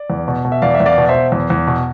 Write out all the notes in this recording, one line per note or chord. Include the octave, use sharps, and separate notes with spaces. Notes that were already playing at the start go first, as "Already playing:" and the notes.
Already playing: D5
E2
B2
B2
E5
E2 D5 F5
E5
E2
D5 F5
B2
C5 E5
B2
E2
E2
B2